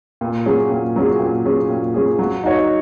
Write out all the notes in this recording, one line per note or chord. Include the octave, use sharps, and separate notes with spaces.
A#2
F#3 C#4 G#4
A#2
F#3 C#4 G#4
A#2
F#3 C#4 G#4
A#2
F#3 C#4 G#4
F#3
D#4 F#4 C#5